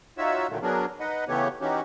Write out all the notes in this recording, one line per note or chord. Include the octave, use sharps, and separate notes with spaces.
D#4 F4 F#4 C#5 E5 E6
A#2 D3 D#3 F#3 A3
F#3 B3 D4 G#4 A#4
D#4 B4 D#5 F#5
C#3 E3 A3 B3 G4 C#5
E3 C#4 D#4 F#4 G4